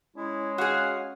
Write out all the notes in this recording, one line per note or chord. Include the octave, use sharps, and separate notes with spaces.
G#3 C#4 E4
F#4 G#4 F5